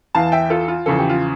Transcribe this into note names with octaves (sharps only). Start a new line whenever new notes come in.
E2 E3 F5 A5
E5 G5
F4 A4
F4
E2 C#3 F3 A4
G4
F4